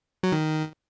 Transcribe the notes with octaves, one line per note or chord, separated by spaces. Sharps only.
F#3
D#3